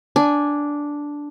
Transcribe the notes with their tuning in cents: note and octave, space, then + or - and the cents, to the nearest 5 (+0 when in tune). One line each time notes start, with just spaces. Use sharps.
D4 -5 G#5 -5